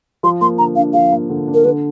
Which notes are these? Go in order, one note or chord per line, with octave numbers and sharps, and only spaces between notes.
F3 C6
A#3 C6
D3 A#5
D4 F5
F3 F5
A#3
D3
D4
A#4
D3 B4